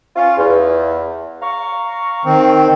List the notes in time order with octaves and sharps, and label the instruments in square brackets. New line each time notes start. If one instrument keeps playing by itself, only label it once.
[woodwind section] C#4 F4
E2
F5 A#5 C#6
[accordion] D#3 C4